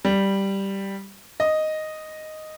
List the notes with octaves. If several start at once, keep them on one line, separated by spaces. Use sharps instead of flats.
G3
D#5